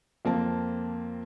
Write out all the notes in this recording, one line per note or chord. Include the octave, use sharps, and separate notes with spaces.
F2 A#3 C4 A5